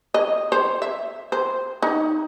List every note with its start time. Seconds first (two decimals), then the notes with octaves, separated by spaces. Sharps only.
0.14 D#5
0.52 C5
0.82 E5
1.32 C5
1.82 D#4